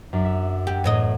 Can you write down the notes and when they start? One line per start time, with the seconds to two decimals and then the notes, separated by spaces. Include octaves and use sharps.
0.13 F#2 D4
0.25 E5 B6
0.67 F#4 G4
0.84 E2 A2 D#5